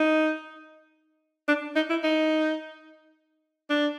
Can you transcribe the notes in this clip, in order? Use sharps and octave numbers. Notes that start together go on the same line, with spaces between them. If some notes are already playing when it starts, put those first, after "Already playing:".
Already playing: D#4
D4
D#4
E4
D#4
D4